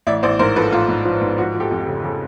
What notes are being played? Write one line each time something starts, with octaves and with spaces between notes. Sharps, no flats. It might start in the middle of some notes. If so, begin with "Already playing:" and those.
A1 D5 E5
A1 C5 D5
G#2 A#4 C5
F3 A4 B4
A1 F4
G#2
F3
G#2
F3 F#4
F3
G4 A4
F2
G4 A4
C#3
C#3 G4 A4